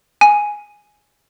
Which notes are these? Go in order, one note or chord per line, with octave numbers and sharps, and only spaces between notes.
G#5